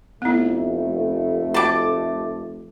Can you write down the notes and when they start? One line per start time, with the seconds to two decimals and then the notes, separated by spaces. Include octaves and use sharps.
0.22 F1 A3 B3 E4
1.54 F#4 A5 D6